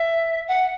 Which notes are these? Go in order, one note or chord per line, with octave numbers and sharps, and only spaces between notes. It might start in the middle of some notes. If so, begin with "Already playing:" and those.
Already playing: E5
F#5